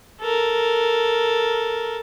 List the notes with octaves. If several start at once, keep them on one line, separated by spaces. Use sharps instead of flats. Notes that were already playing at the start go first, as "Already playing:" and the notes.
A4 A#4